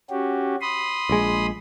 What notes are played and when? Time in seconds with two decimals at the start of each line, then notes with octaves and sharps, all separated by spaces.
0.10 C#4 F#4 G4
0.61 B5 C6 D#6
1.09 A#1 G#3